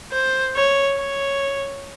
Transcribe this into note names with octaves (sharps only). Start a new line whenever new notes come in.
C5
C#5
C#5